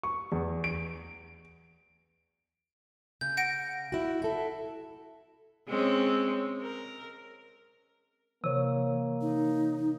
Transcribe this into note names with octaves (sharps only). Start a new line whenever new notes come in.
C#6
E2
D7
C#3 G6
F#5 A#6 D7
E4 F#4
E4 A4
G#3 C4 C#4
A#4
C3 E3 A#3 C#5
D#4